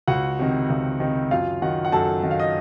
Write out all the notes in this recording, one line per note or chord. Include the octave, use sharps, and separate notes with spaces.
C#2 F#4 F#5
C3 D#3
C#2
C3 D#3
F#2 F4 F5
D#3 F#4 F#5
F#5
F#2 A4 A5
D#3 F#5
F5
D#5